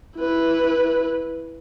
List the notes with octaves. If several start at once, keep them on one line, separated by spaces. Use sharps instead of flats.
E4 B4